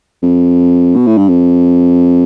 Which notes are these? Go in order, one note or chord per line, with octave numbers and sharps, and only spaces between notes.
F2
B2
A2
G2
F2